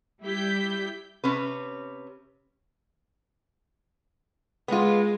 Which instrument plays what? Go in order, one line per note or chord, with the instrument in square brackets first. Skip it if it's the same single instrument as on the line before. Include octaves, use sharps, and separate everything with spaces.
[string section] G3 E4 G4 G6 B6
[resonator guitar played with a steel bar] C3 C#4 B4
[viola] G#3 [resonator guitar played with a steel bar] B3 F4